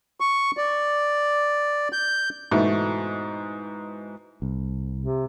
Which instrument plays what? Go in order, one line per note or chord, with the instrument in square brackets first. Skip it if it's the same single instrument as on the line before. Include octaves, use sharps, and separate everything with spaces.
[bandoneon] C#6
D5
G6
[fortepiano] G#2 B2 E3 A3 B3
[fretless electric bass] C2
[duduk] C3